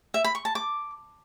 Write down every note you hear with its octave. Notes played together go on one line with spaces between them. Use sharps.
E5
B5
C#6
A5
D6